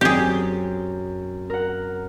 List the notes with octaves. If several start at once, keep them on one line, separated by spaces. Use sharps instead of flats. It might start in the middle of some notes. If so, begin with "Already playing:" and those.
F#2 C4 G4 G#4
A#4 F#5